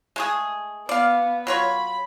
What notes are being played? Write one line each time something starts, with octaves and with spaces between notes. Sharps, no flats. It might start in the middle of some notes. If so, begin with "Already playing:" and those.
G#3 A3 G#4
B3 D5 F5
F#3 F4 C#5 B5